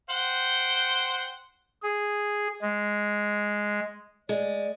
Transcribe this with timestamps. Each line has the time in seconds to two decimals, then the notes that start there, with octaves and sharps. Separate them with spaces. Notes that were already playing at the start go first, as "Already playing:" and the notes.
0.10 C5 F#5 G5
1.82 G#4
2.62 G#3
4.29 G#3 D5